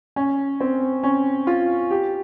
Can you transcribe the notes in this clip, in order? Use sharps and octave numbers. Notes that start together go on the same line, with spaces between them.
C#4
C4
C#4
F4
G4